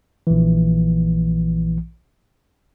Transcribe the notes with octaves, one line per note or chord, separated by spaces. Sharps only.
A#1 E3